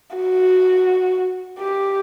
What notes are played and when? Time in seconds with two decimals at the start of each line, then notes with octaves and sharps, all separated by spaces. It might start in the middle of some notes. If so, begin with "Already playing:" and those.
0.16 F#4
1.59 G4